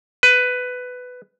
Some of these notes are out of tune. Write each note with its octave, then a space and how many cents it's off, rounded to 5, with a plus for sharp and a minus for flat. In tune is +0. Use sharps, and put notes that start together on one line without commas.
B4 +10